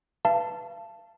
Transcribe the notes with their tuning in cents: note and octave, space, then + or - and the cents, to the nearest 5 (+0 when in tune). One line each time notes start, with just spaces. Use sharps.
B4 +0 F5 -35 A5 +0